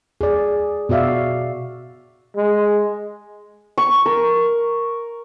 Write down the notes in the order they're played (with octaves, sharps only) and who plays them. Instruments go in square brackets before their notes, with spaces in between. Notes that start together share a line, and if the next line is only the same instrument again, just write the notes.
[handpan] G#4 D5
B2 F#4 D5 E5 F5
[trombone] G#3
[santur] C#6
A#4